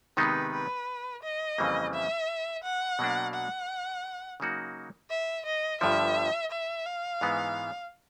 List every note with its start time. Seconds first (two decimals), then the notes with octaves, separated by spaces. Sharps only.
0.17 C3 D#3 G#3 B3 D#4 B4
0.53 B4
1.23 D#5
1.58 F2 C#3 E3 G3 A#3
1.93 E5
2.63 F#5
2.99 B2 F#3 A#3 D4
3.34 F#5
4.40 C#3 F#3 A#3 D#4 F#4
5.10 E5
5.46 D#5
5.81 G1 G2 D3 F3 E5
6.51 E5
6.86 F5
7.21 G#2 E3 G#3 B3